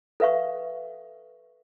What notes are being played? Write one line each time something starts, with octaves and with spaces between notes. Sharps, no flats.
A4 B4 E5 F5 C#6